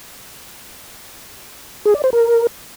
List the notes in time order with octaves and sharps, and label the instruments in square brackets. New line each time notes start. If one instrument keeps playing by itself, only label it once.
[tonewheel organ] G#4
D5
C5
A#4